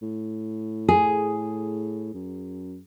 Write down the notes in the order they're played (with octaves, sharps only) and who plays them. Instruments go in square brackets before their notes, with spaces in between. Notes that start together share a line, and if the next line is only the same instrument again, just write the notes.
[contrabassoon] A2
[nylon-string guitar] G#4
[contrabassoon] F#2